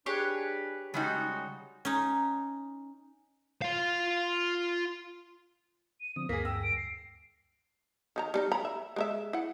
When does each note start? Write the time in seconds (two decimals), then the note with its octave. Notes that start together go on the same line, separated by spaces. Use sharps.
0.06 D4 G4 G#4 B4 C#5
0.94 C#3 G3 G#3 D#4 F#4
1.85 C#4 D#4
3.62 F4 F5
6.01 D#7
6.16 D3 F3 C4 D#6
6.29 D2 G2 A#3 G#4 A#6 B6
6.45 G5 E6
6.63 D7
6.77 C7
8.16 D#3 G#4 A#5
8.34 G3 D4 D#4
8.52 A#5 B5
8.65 E5
8.96 G#3 A#4 E5
9.33 E4 F#5